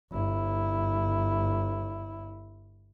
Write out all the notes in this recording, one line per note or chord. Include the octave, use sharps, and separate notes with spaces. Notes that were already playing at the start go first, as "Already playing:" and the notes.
G1 E4